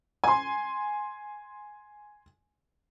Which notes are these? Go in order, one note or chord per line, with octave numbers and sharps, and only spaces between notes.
G#5 C6